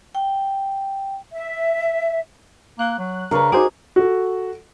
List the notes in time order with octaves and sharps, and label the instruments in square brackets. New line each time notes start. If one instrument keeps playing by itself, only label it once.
[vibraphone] G5
[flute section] E5
[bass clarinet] A#3 [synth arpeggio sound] F#6
[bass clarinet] F#3
[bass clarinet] C#3 [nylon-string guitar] D4 B4 [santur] A#4 C#5
[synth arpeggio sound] D#4 C5 D6 [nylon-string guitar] F#4 [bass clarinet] G#4
[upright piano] F#4 A4